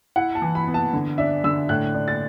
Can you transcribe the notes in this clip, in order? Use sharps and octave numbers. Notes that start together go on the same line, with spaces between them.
E4 F#5
A5
E3
B5
B3
A5
D3
D4 E5
D3 E6
A2 F#6
D4
A6